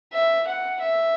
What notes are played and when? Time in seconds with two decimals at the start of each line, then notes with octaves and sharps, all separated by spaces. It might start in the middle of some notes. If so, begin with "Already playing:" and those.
0.13 E5
0.47 F#5
0.81 E5